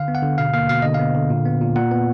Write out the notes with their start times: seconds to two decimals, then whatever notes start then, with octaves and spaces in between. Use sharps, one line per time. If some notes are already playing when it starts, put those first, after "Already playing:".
Already playing: D3 F5
0.08 B3
0.15 F#5
0.23 D3
0.38 B2 F5
0.54 A#3 F5
0.69 B2 F5
0.82 D3 D#5
0.94 B3 F5
1.15 D3
1.30 A#2
1.45 B3
1.61 A#2
1.76 A#2 F#5
1.91 B3